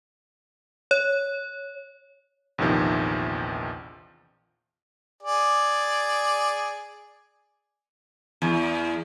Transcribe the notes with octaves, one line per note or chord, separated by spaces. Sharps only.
C#5
A#1 E2 C3 D#3 F3
G#4 D5
E2